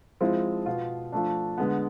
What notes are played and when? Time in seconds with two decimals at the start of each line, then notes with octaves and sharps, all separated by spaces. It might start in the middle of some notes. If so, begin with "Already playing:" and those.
0.21 F3 G#3 C4 E4
0.66 B2 B3 F4
1.12 F3 A3 D4
1.58 D3 G#3 B3